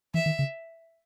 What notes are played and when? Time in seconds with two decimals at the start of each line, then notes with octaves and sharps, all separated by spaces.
0.14 E3 E5
0.26 D#3
0.39 C#3